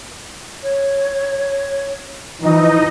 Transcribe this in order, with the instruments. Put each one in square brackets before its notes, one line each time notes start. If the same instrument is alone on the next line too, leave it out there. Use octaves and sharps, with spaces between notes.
[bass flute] C#5
[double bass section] E3 [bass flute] F3 [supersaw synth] D#4 D#5